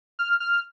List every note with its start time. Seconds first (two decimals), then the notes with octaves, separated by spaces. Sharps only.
0.19 F6
0.40 F6